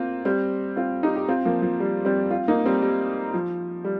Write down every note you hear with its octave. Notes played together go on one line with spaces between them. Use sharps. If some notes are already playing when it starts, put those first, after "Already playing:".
Already playing: A#3 C4 F4
G3 C4
C4 F4
D#4 G4
G4
C4 F4
F3 A#3
F3
G3
G3 C4
C4 F4
A#3 D#4
G3 C4
G3
F3
G3